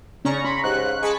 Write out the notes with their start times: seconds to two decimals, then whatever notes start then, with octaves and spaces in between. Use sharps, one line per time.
0.25 C#3 C#4 D5 A#5 C#6
0.44 B5 C6
0.64 G#2 G4 F#6
0.83 F5
1.02 G#3 G#4 A5 B5 C#6